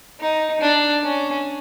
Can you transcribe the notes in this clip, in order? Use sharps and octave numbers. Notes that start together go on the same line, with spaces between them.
D#4
D4
C#4